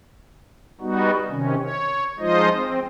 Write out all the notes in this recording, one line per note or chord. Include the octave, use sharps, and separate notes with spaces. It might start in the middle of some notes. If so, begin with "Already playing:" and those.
G3 B3 D#4 F#4
C3 D#3 C#4
C#5
F3 G#3 D#4 F4 C5 D#5
C4